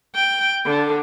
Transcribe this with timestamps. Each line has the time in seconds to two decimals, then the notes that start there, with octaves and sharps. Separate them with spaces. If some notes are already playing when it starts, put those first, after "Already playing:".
0.15 G5
0.66 D3